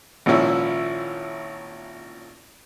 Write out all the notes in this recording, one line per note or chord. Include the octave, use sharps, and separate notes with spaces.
G#1 A#2 F3 C#4 E4